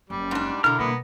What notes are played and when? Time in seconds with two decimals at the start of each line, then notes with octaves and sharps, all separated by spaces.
0.10 F#1 G3
0.31 G#2 D4
0.64 B2 D3 E4 A#4 F6
0.79 B2 G3 A#3 B3